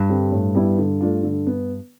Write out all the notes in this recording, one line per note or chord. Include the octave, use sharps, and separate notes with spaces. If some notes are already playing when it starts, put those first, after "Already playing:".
Already playing: G2
D3 G3 C4
A2
G3 B3 E4
D3
A3 D4 F4
D3
B3